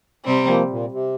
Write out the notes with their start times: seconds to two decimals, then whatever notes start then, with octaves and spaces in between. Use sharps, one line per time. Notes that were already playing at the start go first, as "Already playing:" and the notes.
0.24 C3 G3 C4
0.47 F3 A#3
0.70 A#2
0.92 C3